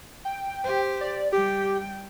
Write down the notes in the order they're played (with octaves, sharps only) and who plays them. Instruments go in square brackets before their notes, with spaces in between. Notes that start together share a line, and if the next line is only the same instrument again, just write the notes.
[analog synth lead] G5
[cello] G4 C5
[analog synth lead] D5
[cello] G3 G5 [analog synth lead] G4